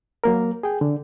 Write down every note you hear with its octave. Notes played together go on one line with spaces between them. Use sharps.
F#3 A#3 A#4
G#4 G5
D3